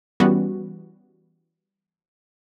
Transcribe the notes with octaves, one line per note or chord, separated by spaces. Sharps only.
E3 G3 B3 C#4 F#4